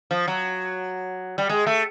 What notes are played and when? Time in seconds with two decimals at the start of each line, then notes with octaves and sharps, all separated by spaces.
0.11 F3
0.28 F#3
1.38 G3
1.49 G#3
1.67 A3